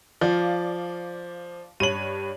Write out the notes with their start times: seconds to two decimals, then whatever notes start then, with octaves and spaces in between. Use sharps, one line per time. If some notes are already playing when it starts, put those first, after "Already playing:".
0.21 F3 D5 F5
1.80 G2 C#5 D#7 F#7